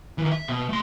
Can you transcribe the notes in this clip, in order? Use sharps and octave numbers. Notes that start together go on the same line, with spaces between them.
D#3 E3
E5
B2
A3 C6